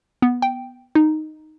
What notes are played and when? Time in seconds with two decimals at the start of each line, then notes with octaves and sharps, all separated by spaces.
0.22 B3
0.42 G5
0.95 D#4